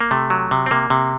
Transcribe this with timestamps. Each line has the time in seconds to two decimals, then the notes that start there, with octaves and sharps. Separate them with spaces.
0.01 A#3
0.11 C3 A3
0.30 F#3
0.51 C3
0.66 C4
0.71 C3 A#3
0.90 C3